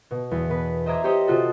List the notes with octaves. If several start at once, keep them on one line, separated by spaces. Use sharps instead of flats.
B2
E2
B2 B4
C5 D#5 E5 A#5 D6 G#6
G4 C5 C#5 D#5
C3 F4 F#4 A4